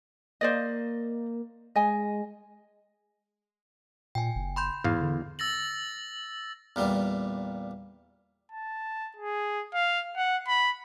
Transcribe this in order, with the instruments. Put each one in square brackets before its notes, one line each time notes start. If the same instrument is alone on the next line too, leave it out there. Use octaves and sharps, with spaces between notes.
[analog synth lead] A#3 [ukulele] C5 D5 D#5
[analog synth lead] G#3 [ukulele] D#5 G#5
[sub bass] A#2 [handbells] G5 G#5
[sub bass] F#1
[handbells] B5 C6 G6
[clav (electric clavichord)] E2 F5 [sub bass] G#2
[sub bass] D3
[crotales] E6 A6 A#6 F#7
[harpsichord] E2 A#2 G3
[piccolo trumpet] A5
G#4
F5
F#5
B5